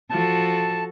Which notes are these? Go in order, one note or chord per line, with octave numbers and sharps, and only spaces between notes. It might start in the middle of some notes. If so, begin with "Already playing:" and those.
F3 F#4 A4 A5